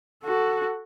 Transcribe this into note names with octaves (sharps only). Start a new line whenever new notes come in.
F#4 A4